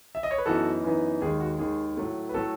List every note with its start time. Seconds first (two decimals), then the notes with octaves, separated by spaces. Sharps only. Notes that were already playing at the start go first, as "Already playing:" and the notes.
0.15 E5
0.23 D#5
0.31 C#5
0.38 B4
0.46 F#2 E3 B3 D#4 F#4 A4
0.84 F#2 E3 B3 D#4
1.21 D#2 D#3 G#3 G#4
1.41 F#4
1.59 D#2 D#3 G#3 G#4
1.97 A2 F#3 A3
2.29 B4
2.34 A2 F#3 A3 F#4 A4